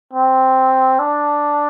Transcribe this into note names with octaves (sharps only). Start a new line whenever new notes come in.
C4
D4